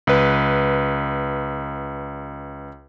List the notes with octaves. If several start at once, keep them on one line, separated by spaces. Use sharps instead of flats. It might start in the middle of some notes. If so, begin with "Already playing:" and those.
C#2 B4